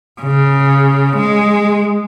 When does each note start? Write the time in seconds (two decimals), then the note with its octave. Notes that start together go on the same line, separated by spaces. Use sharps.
0.22 C#3
1.17 G#3